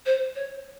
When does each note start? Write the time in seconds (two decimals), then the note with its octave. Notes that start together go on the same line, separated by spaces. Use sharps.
0.06 C5
0.36 C#5